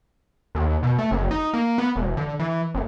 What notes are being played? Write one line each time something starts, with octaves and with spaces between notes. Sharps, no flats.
D#2
B2
A3
F#1
D#4
A#3
B3
E1
D3
E3
F#1